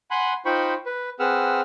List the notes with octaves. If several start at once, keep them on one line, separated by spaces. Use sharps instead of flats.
F#5 G#5 B5 C6 F#6
D#4 F4 C5 G5 B5 C#6
B4
C4 G#4 B4 F#5 E6 F6